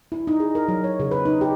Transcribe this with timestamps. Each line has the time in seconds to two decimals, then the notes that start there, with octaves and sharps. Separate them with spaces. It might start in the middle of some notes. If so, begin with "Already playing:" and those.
0.12 E4
0.27 D#4
0.40 G#4
0.55 A#4
0.68 F#3
0.84 C#5
1.00 C#3
1.11 B4
1.25 D#4
1.41 G4